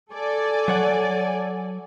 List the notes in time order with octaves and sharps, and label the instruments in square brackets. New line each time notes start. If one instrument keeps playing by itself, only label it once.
[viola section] A4 D5 G#5
[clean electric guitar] F#3 C#5 F#5